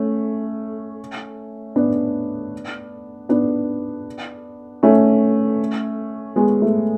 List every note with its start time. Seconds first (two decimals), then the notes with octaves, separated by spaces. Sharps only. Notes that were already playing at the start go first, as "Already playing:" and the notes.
Already playing: A3 C#4
1.76 B3 D4
3.29 B3 D4
4.83 A3 C#4
6.36 G#3 B3
6.62 A3